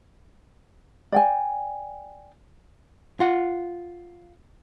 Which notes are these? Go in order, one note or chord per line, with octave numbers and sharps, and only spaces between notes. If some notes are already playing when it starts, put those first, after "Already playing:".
D5 G5 G#5
F4 F#5